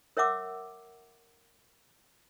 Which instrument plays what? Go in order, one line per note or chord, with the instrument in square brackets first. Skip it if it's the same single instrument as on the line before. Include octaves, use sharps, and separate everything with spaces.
[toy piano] A#4 C#5 E5 F#5 D6 E6